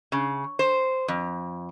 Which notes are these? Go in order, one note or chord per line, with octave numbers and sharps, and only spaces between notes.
C#3
C5
F2